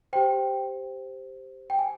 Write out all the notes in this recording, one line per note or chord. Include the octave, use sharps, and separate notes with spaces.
G4 C5 G5
G5
G#5